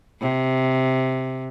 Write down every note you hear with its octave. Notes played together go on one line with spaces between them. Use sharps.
C3